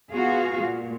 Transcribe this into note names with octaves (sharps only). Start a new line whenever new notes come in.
B3 F4 F#4 G#4 F5
A#2